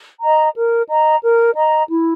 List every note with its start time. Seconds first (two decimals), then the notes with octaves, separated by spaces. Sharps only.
0.21 D#5 A#5
0.55 A#4
0.89 D#5 A#5
1.22 A#4
1.56 D#5 A#5
1.89 E4